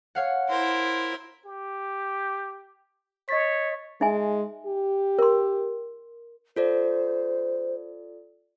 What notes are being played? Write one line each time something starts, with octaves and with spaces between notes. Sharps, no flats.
C#5 F5 F#5
E4 A#4 C5
G4
C#5 D#5 A6 B6
G#3 D#4 E5 G#5
G4
A#4 C6
F4 A4 C5 D5